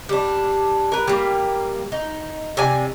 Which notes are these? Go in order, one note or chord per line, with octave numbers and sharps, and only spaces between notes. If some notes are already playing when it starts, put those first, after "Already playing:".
G3 D4
A#4 B4
G3 A#3
D#4
C3 D5 G#5